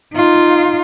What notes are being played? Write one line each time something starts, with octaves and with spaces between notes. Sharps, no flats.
D#4 F4